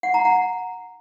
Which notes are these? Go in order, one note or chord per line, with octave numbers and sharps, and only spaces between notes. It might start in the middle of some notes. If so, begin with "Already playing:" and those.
F#5
A#5
F#5